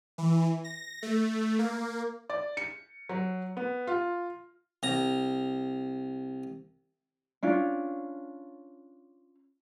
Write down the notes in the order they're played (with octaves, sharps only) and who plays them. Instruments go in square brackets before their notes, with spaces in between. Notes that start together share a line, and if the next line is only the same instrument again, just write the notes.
[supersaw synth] E3
A#6
A3
A#3
[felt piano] D5
C#7
F#3
B3
F4
[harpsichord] C2 A#5
[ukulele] C#4 D4 F4